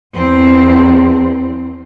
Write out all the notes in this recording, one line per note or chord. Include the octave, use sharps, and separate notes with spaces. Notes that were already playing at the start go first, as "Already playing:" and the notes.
E2 C4